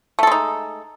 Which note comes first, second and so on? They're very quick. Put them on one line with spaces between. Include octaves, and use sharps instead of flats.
A3 A4 G#3 D#4